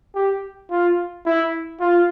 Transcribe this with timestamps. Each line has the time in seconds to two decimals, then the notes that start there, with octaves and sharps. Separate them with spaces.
0.15 G4
0.71 F4
1.26 E4
1.81 F4